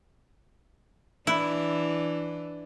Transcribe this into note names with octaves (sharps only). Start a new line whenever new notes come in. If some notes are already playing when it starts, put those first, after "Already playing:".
E3 D4 E4